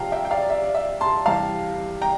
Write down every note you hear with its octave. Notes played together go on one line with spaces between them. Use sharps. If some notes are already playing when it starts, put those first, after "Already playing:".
Already playing: C3 F3 F5 G5 A5 A#5
E5 G5
G5
D5 F5
D5
E5
D5
E5
A5 C6
C3 E3 G3 F5 A5
G5 A#5